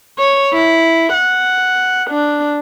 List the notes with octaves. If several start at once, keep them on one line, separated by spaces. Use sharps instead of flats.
C#5
E4
F#5
D4